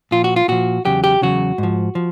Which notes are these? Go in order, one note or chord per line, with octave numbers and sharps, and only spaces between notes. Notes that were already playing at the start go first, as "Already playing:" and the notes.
A#2 F3 F4
F#4
F4
A#2 F3 F#4
E2 C#3 F#3 G4
G4
E2 C#3 F#3 F#4
G#2 F3
F3